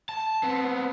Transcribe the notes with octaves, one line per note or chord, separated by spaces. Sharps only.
A5
B3 C4